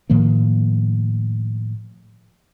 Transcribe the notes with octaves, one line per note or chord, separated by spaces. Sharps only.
A2 D#3 F3 A#3